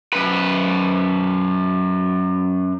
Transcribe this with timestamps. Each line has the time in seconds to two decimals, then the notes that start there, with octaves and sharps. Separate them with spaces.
0.13 F#2 B4